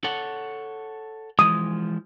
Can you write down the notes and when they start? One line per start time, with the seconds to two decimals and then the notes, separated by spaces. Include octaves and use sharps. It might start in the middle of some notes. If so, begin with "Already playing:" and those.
0.04 A4 C#5 F#5
1.39 E3 F3 G#3 D#6